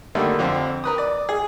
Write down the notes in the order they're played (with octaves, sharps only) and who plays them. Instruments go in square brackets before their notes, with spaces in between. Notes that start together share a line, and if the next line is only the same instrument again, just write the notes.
[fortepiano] D3 D#3 G3 A3 A#3
F2 D3 C4
A#4 B4 D#6
D5
G#4